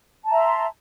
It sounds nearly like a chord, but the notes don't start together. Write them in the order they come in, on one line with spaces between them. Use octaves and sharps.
A5 A#5 E5 C6